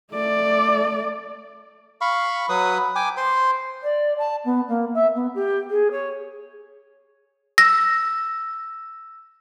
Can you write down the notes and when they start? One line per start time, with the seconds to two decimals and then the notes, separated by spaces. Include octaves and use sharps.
0.13 A3 D5
2.01 F5 B5 C#6
2.49 F#3 B4 D#6
2.96 G5 G#5 D6
3.17 C5 C6
3.82 D5
4.18 A5
4.44 B3
4.68 A#3
4.94 E5
5.15 B3
5.34 G4
5.70 G#4
5.91 C#5
7.58 E6 A#6